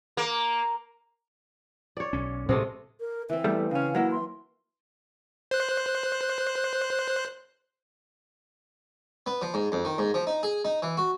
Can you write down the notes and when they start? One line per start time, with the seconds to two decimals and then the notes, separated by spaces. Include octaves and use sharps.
0.17 A#3
1.97 C#5 D5
2.13 B1 C#4
2.49 A2 C3 G#3 A3
3.00 A#4
3.30 E3 C4 E5
3.44 E2 G3 A3
3.71 C#3 C#4 F5
3.95 F#3 A#3 E4 F#5
4.11 C6
5.51 C5 F#6
9.26 B3
9.42 F3
9.54 G#2
9.72 F2
9.85 D#3
9.98 G#2
10.14 F3
10.27 D#4
10.43 G#4
10.65 D#4
10.82 E3
10.97 F#4